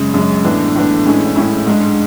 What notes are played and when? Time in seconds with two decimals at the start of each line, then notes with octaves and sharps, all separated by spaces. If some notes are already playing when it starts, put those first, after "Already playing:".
Already playing: F#2 C#3 G#3
0.14 F#2 C#3 G#3
0.45 A2 E3 B3 D4
0.75 A2 E3 B3 D4
1.05 A2 G#3 C#4 E4
1.36 A2 G#3 C#4 E4
1.66 G#2 G#3 D4